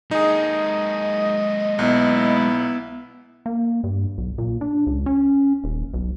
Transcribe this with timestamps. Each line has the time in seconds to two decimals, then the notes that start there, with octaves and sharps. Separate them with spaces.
0.11 G#3 A#3 D#4 G#4 D#5
1.79 B1 B3 E4
3.46 A#3
3.84 G2
4.18 B1
4.38 A#2
4.61 D4
4.87 C#2
5.06 C#4
5.64 D#1
5.94 B1